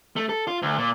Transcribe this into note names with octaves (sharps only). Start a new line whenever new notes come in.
A3
A4
F4
D2
A#2